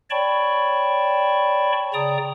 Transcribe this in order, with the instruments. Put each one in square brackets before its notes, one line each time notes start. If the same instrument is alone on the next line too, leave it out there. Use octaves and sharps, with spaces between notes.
[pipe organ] C#5 D5 G5 A5 B5 C#6
C#3 D5 G5 A#5 D#6